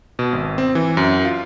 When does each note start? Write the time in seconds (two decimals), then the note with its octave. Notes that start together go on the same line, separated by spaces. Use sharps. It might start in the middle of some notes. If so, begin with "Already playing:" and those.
0.19 B2
0.33 G#1
0.58 C4
0.75 E3
0.97 F#2
1.25 F4